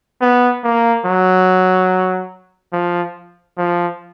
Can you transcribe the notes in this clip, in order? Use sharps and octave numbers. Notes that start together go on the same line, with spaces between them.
B3
A#3
F#3
F3
F3